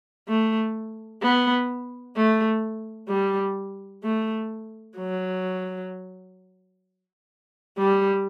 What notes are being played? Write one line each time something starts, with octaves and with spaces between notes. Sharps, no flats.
A3
B3
A3
G3
A3
F#3
G3